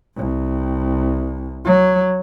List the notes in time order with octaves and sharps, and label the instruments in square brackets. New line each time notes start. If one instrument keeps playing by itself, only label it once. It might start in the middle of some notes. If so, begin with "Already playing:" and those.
[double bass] C2
F#3